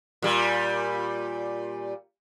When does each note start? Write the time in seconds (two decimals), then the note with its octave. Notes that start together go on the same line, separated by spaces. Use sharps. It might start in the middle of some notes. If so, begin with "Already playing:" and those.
0.22 A#2 G3